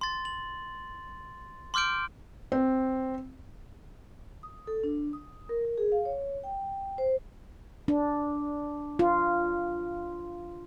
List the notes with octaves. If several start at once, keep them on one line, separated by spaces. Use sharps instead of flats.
C6 A6
F#7
C6 D6 F6 G6 D7
C4
D#6
A4
D4
D#6
A#4
A#4
G#4
F5
C#5
G5
C5
D4
F4